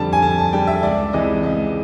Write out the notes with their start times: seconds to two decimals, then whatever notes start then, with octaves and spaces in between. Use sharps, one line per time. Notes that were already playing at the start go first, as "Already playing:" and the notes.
Already playing: F2 D3 G3 A5
0.13 G#5
0.22 F2 A5
0.38 A5
0.53 D3 G3 G5
0.67 E5
0.83 C#2 D5
1.13 C3 E3 G#3 D#5
1.43 C#2 D#5